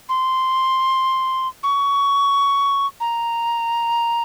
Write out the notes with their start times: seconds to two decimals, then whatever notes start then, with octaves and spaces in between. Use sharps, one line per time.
0.09 C6
1.63 C#6
3.00 A#5